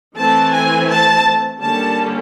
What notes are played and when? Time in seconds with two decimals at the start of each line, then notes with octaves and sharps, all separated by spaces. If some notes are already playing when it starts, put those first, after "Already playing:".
0.16 E3 A3 C4 A5
0.52 G#5
0.88 A5
1.59 D3 G3 A#3 C#4 A5